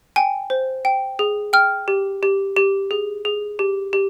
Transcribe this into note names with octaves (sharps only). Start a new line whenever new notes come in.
G5 G#5
C5
G5
G#4
G5 F6
G4
G4
G4
G#4
G#4
G4
G4